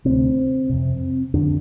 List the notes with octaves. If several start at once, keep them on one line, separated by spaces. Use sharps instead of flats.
D2 C3 C4
F2 C3
F2 D3 D4